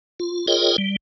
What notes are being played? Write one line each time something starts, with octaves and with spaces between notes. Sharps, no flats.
F4
F4 G#4 A#4 C#5 D#5 G5
G3